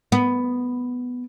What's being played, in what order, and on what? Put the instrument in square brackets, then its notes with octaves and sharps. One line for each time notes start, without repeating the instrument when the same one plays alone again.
[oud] B3